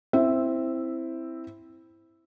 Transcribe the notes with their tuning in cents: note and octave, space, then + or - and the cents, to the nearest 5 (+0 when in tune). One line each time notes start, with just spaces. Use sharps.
C4 +0 E4 +0 E5 +0